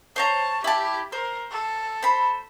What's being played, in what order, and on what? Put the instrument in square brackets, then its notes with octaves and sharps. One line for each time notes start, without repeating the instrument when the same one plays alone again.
[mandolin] C5 C#5 A#5 [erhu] A5
[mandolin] E4 A5 [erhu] G4
[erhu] A#4 [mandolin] C5
[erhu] A4
[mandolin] C5 B5